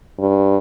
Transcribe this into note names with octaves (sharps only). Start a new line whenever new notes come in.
G2